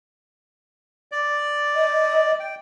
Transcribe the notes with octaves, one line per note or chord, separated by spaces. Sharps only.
D5
D#5
G5